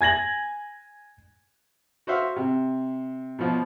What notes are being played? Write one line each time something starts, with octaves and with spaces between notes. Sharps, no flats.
G#5 G#6 A#6 F#7
F#4 C5 E5 F5
C3
B2 F3